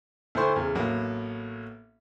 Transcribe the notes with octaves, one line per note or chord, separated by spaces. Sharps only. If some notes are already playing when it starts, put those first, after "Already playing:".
D2 A3 E4 C5 C6 C#6
E2 C#3
A1 F#3 A#3 B3